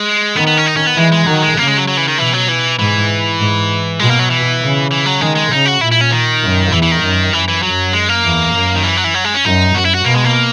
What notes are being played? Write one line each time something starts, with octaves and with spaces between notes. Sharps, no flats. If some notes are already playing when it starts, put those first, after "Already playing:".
Already playing: G#3
D#3 B3
B3
C#4
D#4
C#4
B3
E3 G#3
G#3
D#3 F#3
G#3
C#3 A#3
G#3
F#3
F#3
E3
D#3
B2 E3
F#3
E3
G#2 E3
G#2
B2 G#3
A#3
F#3
E3
C#3
E3
F#3
D#3 G#3
G#3
C#3 D#4
F#4
A#2 E4
E4
C#4
D#3
F#2
E2 E3
E3
D#3
F#2
F#2 E3
E3
F#2 F#3
G#3
A#3
E2
F#2
D#3
E3
F#3
E3
F#3
G#3
C#4
F#2 D#4
F#2 F#4
E4
F#4
B2 A#3
G#3
A#3